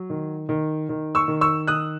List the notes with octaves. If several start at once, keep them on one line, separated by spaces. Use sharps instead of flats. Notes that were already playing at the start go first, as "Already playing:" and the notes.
Already playing: F#3
D#3
D#3
D#3
C#6 E6
D#3
C#6 E6
D#3 D#6 F#6